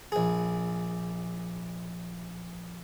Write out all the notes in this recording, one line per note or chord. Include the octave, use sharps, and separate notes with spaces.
A#1 G#4